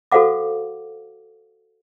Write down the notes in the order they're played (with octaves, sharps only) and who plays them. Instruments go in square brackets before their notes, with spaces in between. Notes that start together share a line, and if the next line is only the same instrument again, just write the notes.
[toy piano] F#4 A4 C5 F5 F#5 D6